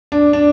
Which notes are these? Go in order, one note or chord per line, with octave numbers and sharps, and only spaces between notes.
D4
D4